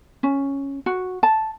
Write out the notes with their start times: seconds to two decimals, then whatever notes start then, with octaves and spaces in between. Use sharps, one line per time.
0.23 C#4
0.86 F#4
1.23 A5